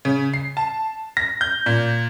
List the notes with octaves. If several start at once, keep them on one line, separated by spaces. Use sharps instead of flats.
C#3
C7
A5
A#6
G6
A#2